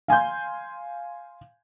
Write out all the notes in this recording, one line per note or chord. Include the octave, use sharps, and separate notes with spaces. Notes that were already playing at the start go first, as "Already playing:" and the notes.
F5 G#5 C6 G6